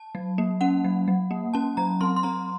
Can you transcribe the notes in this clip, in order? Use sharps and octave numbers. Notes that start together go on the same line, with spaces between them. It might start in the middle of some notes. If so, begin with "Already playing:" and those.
Already playing: A5
F#3
A#3
C#4 F#5
F#3
F#3
A#3
C#4 A5
F#3 A#5
C4 C6
C6
C4 A#5